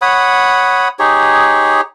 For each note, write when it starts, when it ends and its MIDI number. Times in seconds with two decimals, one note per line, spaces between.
0.02 0.88 73
0.02 0.88 78
0.02 0.88 83
0.02 0.88 87
0.99 1.81 63
0.99 1.81 67
0.99 1.81 68
0.99 1.81 73